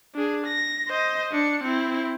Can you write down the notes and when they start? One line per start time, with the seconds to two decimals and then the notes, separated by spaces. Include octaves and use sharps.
0.15 D4 G#4
0.46 A#6
0.88 C5 D#5
1.32 D4 C#7
1.64 C4 E4